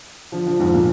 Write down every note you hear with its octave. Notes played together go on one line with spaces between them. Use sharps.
D3 F3
D3 F3
F2 G#2
A#2 D3